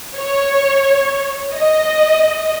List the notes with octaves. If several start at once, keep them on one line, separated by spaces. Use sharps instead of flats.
C#5
D#5